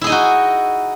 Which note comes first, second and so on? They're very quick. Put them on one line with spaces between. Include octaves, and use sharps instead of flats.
E4 G#4 D#5 D#4 F#4